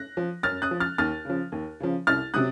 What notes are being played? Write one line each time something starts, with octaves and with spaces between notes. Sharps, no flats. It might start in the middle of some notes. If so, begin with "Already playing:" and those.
Already playing: F#6 A#6
F3
F#2 F6 A6
D#6 F#6
F3
F6 A6
D#2 F6 A6
C#3 F3
D#2
C#3 F3
C2 F6 A6
C3 F#3 D#6 F#6